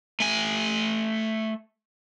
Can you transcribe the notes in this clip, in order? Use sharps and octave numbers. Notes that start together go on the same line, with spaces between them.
A3 G#5